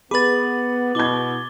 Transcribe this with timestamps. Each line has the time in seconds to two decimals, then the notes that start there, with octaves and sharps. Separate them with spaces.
0.11 B3 G#4 B4 B5 D6 A6
0.95 B2 E4 D6 G#6 G7